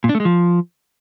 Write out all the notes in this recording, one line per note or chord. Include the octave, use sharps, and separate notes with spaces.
A#2
D4
A3
G#3
F3